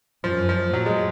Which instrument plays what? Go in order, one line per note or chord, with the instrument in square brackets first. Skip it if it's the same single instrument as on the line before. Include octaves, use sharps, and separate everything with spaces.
[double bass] F#2 [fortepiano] F3
[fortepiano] F3
[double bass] A#2 [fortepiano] F#3
[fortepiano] G#3